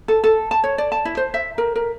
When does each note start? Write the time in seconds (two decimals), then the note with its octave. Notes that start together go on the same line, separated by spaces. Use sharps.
0.08 A4
0.24 A4
0.51 A5
0.64 C#5
0.78 D5
0.92 A5
1.05 E4
1.17 C5
1.34 E5
1.58 A#4
1.76 A#4